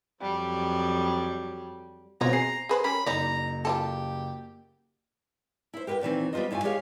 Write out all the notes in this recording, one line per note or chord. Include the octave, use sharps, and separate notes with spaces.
F2 F#3 G3
B2 C4 F4 C#5 D#5 A#5
G#4 C7
G#4 B4 C5
G3 C#4 A#4 B5
F#1 D#4 D5 A#5
G3 F4 G4 A4
E4 C5
G4 A#4 B4 F#5 G5
A#2 D#3 E3 C4
G3 B3 F4 C5 D#5
G2 E4 F4 C#5 G#5
G#3 G4 G#4 C#5 F5